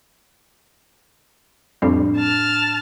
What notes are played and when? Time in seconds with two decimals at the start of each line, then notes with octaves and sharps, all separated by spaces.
1.82 F2 A2 G3 D4
2.18 A5 F6